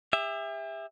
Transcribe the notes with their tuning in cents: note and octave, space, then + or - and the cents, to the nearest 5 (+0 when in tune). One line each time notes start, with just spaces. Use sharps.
G4 +45 E5 +0